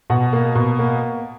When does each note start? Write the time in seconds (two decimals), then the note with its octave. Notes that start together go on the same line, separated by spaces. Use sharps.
0.10 B2 F#5
0.33 A#3
0.55 B2
0.79 A#3